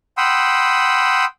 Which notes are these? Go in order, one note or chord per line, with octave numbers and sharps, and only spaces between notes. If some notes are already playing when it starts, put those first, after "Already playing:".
F#5 G5 B5 C6 D#6 E6